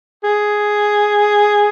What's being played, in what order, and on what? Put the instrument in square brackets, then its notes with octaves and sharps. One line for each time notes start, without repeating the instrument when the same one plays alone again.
[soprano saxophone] G#4